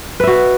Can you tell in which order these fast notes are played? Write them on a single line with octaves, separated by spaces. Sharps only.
B4 E5 F#4